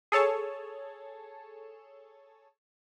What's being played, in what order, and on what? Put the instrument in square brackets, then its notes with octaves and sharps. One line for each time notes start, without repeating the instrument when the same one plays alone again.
[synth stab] G#4 A4 C#5 A5